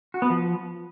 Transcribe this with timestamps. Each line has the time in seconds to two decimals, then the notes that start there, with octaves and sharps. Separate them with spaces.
0.14 F#4
0.22 B3
0.30 F3